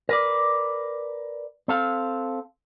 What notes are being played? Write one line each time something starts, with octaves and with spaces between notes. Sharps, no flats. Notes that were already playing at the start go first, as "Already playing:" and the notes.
A#4 B4 D5
C4 A4 F5